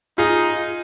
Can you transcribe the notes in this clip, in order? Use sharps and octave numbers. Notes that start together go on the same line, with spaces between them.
D#4 F4 G#4